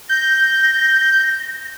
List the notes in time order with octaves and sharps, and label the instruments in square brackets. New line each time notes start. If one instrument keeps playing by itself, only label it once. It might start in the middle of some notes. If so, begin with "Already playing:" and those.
[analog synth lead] G6 [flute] A#6